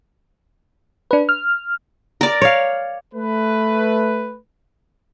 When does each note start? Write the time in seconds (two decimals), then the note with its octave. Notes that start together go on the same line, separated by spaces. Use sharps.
1.11 D4 B4
1.29 F6
2.21 A#4 D5
2.42 C#5 F5
3.14 A3 B4